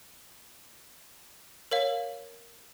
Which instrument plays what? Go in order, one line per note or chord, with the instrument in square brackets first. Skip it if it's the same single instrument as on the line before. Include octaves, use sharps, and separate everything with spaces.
[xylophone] A#4 C#5 F5